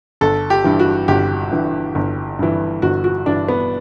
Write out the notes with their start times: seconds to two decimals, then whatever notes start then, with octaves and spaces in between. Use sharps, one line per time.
0.21 G1 A4
0.50 G4
0.64 G2 E3
0.80 F#4
1.08 G1 G4
1.51 G2 E3
1.95 G1
2.39 G2 E3
2.82 G1 F#4
3.04 F#4
3.26 G2 E3 D4
3.48 B3